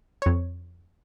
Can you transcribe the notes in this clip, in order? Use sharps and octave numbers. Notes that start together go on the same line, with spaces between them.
F2 C#5